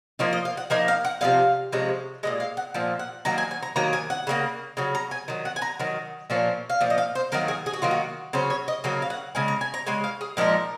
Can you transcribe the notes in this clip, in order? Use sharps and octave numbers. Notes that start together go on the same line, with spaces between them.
F3 A#3 D#4 C#5
D#5
F5
F#5
F3 A#3 D#4 G#5
F5
F#5
C3 F3 G#3 C#4 F5
C3 F3 G#3 C#4
A#2 F3 G#3 D#5
F5
F#5
A#2 F3
F#5
D#3 F#3 A#3 A#5
G#5
G#5
A#5
D#3 F#3 A#3 A#5
G#5
F#5
C#3 F#3 A#3
C#3 F#3
A#5
G#5
D#3 F#3
F#5
G#5
A#5
D#3 F#3
A#2 F3 A#3 C#4
F5
A#2 F3
D#5
F5
C5
D#3 F#3 A#3 A#4
G#4
G#4
F#4
D#3 F#3 A#3 F4
F#4
C#3 F#3 C#4 C5
C#5
D#5
C#3 F#3 A#3 C#4
F5
F#5
C#3 G#3 G#5
A#5
G#5
A#5
C#3 G#3 G#5
F5
G#4
A#2 F3 G#3 D#4 A#4